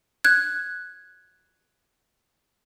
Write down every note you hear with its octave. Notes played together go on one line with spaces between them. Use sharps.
F#6 G#6